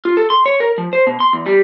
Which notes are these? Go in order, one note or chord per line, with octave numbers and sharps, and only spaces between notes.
F4
A4
C6
C#5
A#4
F3
C5
B2
C6
E2
G3